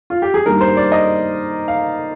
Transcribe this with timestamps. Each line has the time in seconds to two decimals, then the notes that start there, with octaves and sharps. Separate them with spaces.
0.10 F4
0.22 G4
0.34 G#4
0.46 G2 D#3 G3 A#3 A#4
0.61 C5
0.77 D5
0.92 D#5
1.68 F5